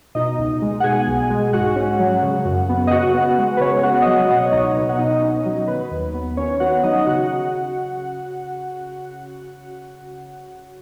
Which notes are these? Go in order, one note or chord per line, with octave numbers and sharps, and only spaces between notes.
B2 D#4 D#5
C#2
G#3
F#5
B2 G#4 G#5
B1
G#3
G#2 F#4 F#5
C#4
F#3
C#3
F#2
B3
D#5
C#3 F#4 F#5
B3
G#3
B4
C#3 C#4 C#5
B3 F#4 F#5
D#5
F#3 F#4 F#5
B2 F#5
D#5
C#5
C#2 D#4 D#5
B3
F#5
B2 D#4 D#5
C#4
F#3
D#3 B4
D#2
B3
D#3 C#4 C#5
B3 F#4 F#5
F#3 D#4 D#5
D#5
C#3 F#4 F#5